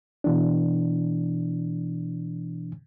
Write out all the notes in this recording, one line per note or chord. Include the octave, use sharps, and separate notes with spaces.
B2 E3 D4